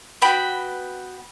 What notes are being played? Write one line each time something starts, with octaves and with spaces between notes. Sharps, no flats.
B3 F#4 G5 B5